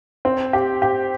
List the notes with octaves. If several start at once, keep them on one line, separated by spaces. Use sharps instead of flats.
C4
G4
G4